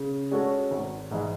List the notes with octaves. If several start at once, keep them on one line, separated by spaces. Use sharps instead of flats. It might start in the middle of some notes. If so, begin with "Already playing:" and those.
Already playing: C#3
G#3 C#4 F#4 A4
G#1
G#2 E3 G#3